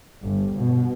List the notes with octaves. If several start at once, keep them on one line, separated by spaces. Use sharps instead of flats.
G1
B2